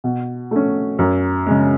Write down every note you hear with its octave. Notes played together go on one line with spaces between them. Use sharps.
B2
A3 C#4
F#2
C#3 G#3